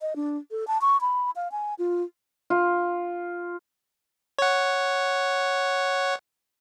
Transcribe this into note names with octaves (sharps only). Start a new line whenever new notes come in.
D#5
D4
A4
A5
C#6
B5
F5
G#5
F4
F4
C#5 F#5